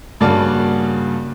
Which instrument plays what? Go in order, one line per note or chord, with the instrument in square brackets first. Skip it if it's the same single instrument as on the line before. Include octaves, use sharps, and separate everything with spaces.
[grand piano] G2 C#3 A#3 F#4 D5 A5